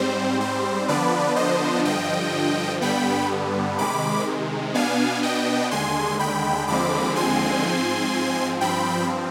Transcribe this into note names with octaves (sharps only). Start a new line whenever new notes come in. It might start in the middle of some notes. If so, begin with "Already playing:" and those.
Already playing: G#2 G3 C4 C5
C5
D3 F3 B3 D4 B4 D5
C5 D#5
G2 D3 F3 D#5 G5
G2 D3 G3 B3 G5 B5
C3 D#3 G#3 B5 D6
B2 B3 D4 F5 G#5
D#5 G5
D#2 D3 G#3 G#5 C6
G5 B5
D#2 D3 F3 G#3 C4 B5 D6
G#5 C6
G#2 F3 C4
G2 F3 C4 G5 B5